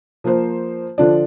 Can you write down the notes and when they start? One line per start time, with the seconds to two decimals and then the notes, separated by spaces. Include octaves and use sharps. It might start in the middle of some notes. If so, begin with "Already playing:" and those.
0.24 F3 A#3 F4 C5
0.98 D3 F3 D4 F4 D5